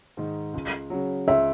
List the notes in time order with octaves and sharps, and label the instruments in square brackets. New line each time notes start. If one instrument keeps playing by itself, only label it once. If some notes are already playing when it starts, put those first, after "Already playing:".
[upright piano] G#2 D#3
C#2
C#3 F#3
[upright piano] C#2 [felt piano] E5